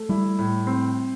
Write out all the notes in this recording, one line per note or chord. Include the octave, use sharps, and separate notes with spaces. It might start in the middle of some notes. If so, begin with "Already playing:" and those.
Already playing: A3
G3 E4
A2
C4